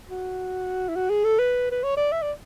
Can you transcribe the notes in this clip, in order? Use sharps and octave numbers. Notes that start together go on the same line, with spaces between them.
F#4
E4
F#4
G#4
A4
B4
B4
C#5
D5
E5
D5